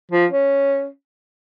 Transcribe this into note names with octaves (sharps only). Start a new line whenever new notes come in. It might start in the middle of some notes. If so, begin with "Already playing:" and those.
F3
C#4